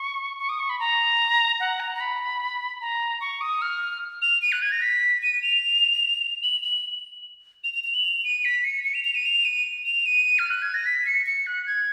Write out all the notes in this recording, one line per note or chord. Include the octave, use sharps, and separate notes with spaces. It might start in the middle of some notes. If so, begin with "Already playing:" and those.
Already playing: C#6
C#6
D#6
C#6
B5
A#5
F#5
A#5
A#5
B5
A#5
C#6
D#6
F6
F7
D#7
F#6
G#6
A#6
B6
D#7
F7
F#7
F#7
F7
F7
F7
F#7
F7
D#7
B6
C#7
C#7
F7
F7
D#7
F7
D#7
F7
D#7
F6
F#6
G#6
A#6
B6
C#7
C#7
F#6
G#6